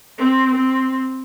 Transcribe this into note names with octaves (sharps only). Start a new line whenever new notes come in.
C4
C4